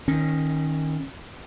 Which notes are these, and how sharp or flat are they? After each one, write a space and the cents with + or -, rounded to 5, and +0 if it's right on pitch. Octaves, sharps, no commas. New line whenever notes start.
D#3 +0 C#4 -25